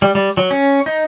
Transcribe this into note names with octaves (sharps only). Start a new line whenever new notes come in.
G3
G3
F#3
C#4
D#4